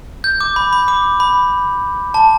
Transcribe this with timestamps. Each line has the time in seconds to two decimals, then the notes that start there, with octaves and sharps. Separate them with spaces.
0.24 G6
0.41 D6
0.56 B5
0.73 B5
0.88 D6
1.20 B5
2.14 A5